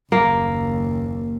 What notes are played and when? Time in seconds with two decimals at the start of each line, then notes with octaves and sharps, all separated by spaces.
0.12 F#1 D#2 A#3